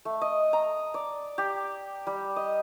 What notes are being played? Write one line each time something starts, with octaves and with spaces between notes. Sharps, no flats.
A3
D#5
A#5
D5
G4
G3
D#5